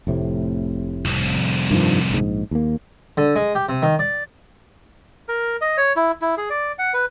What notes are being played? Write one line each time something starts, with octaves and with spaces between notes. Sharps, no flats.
F1 A2 C3
C2 F2
G2 D#3 F3
A#1 G#2
D#2 A#3
D3
G#3
G4
C3
D#3
D5
A#4
D#5
C#5
E4
E4
G#4
D5
F#5
B4